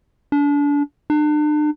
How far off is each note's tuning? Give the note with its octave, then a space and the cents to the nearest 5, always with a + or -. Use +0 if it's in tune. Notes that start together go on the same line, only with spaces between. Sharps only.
D4 -30
D4 +40